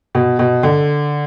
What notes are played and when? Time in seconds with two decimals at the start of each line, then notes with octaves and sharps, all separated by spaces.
0.15 B2
0.39 B2
0.63 D3